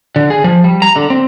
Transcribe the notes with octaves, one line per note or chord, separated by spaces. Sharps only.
D3
G#4
F3
G3
A#5
D3
C4